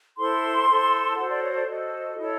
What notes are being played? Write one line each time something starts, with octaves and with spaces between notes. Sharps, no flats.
E4 A4 C5 C6
E4 A4 C5
F#4 A4 C5 F#5
D5
C#5
D5
F#4 A4 C5 D#5
E4 A4 C#5